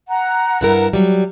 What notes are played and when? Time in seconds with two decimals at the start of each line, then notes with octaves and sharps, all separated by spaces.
0.09 F#5 A#5
0.61 G2 E4 A#4
0.93 F#3 G3